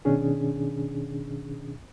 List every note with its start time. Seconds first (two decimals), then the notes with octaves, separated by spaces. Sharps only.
0.05 B2 D#3 C#4 D4 G#4